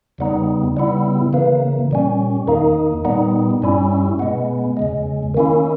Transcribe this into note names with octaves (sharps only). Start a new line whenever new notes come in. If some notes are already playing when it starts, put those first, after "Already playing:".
E2 C#3 G3 B3 D#4
C#3 G3 B3 E4
C#3 E3 A#3
A#2 G3 C#4
E2 D#3 A#3 D#4
A#2 G3 B3 D#4
G2 G3 C#4 E4
B2 G#3 B3
E2 C#3 G#3
D#3 A#3 C#4 E4